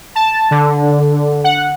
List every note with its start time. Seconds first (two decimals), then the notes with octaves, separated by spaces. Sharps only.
0.15 A5
0.51 D3
1.44 F#5